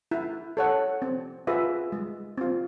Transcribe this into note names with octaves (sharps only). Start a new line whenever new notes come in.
E4
A4 C#5 F#5
C4
F4 G#4 B4 E5
G#3
C4 F4